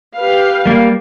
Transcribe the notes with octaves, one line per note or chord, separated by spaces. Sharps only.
G4 B4 F5
G3 A#3